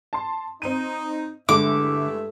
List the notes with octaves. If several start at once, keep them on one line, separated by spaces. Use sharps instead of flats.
A5 C6
C4 D#4 D#7
G2 D3 G#3 A3 E4 E5 D6